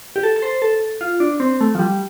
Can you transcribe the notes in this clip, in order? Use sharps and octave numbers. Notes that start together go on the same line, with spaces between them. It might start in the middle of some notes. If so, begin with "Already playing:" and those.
G4
A4
A4
C5
A4
F4
D4
C4
A3
F3
G3